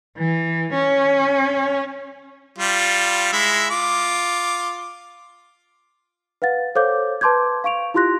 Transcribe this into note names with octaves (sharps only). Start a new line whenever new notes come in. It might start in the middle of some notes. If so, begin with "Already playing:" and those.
E3
C#4
G3 F4
G#3 E4 E5
F4 D6
B4 F5 F#5 A6
A4 C5 C#5 F5 D6 G6
B4 A5 C6 D6 G6 G#6
F5 C#6 D7 F7
E4 F4 G4 C6 F#6 A#6